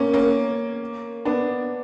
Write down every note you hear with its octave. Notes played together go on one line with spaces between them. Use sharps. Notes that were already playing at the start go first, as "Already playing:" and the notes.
Already playing: A#3 C#4
A#3 C#4
B3 D4